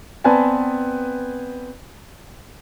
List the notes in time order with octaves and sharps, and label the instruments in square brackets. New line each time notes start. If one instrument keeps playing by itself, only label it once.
[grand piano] B3 C4 B4 D5 G#5 A5